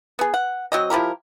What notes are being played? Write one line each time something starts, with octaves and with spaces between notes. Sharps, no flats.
B3 G#4
F#5
F#3 C4 D#5
F3 E4 G4 A#4